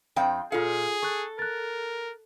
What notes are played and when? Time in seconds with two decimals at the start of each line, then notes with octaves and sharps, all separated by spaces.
0.16 F2 C4 F5 G5
0.52 A#2 F4 G#4 A4 F5 C#7
1.03 A4 C#6 F#6
1.39 A#4 F#6 A6